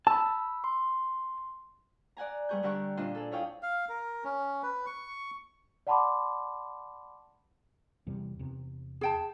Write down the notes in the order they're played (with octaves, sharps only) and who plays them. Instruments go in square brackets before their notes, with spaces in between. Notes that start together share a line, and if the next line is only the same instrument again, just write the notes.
[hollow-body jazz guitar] A5 [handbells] B5 E6
[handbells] C6
[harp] D5 F#5 G#5 A#5
G3 B3 G#4 C#6 G6
D3 G3 G4 A#4 F#5 C#6
A#2 C4 D4 F4 D#5 C6
G#4 A4
E4 G#4 C#5 F5 G5 D#6
[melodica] F5
A#4
C#4
B4
C#6
[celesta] D5 F#5 A5 B5 C6 D6
[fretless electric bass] E2 C3 G3
E2 C3
[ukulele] G#4 G5 A5